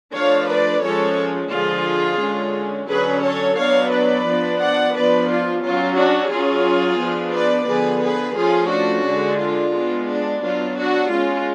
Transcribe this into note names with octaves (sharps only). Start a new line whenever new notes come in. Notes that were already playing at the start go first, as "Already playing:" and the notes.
F3 A3 D4 C#5 F5
B4 D5
F3 G#3 C#4 A4 C#5
D3 F3 G#3 F4 G#4
D3 G#3 C#4
D3 F#3 C#4 G#4 B4
A4 C#5
F#3 B3 D4 C#5 F5
B4 D5
F3 B3 D4
D5 F#5
F3 B3 D4 B4 D5
F4
F#3 C#4 F4
D4 F#4
F#3 C#4 F4 G#4
F3 B3 D4
B4 D5
D3 F3 B3 G#4 B4
G#4 B4
F3 A3 C#4 F4 G#4
D4 F#4
D3 G#3 D4
F4
G#3 B3 D4
D4
F#3 B3 D4 F4
D4 F#4
G#3 C#4 F4